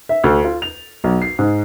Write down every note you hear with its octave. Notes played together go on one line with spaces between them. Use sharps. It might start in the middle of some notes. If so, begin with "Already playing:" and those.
E5
D2
F4
F7
B1
C7
G#2